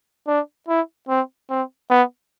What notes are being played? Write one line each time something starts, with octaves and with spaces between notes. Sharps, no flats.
D4
E4
C4
C4
B3